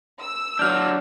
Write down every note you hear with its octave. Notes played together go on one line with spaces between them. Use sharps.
E6
F#3 D4 F6 G6